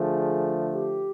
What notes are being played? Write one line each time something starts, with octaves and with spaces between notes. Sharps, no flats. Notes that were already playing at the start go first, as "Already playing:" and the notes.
Already playing: D3 F3 A3 G#4
G4